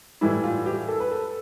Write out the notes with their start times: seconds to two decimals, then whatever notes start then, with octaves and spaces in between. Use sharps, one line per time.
0.21 A2 E3 G3 E4
0.44 F4
0.66 G4
0.88 A4
1.00 B4
1.11 A4